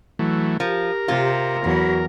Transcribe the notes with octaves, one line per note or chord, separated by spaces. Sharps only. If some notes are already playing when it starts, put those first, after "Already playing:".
E3 F#3 A3
F3 G4 A#4
C3 F4
E2 F#3 F#4